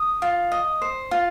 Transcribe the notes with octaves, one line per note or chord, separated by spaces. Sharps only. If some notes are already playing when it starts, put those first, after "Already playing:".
Already playing: D#6
F4
D#5
C5
F4